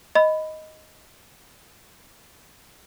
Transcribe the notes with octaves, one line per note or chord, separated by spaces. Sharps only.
D#5 B5